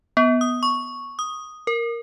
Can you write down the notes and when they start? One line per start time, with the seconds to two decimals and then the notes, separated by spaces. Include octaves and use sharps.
0.17 B3
0.41 D#6
0.63 C#6
1.19 D#6
1.67 A#4